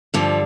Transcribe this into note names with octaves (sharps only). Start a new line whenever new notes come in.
G2 D3 F3 G3